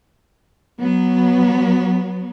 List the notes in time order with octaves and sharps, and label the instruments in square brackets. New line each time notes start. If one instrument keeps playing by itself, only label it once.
[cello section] F#3 B3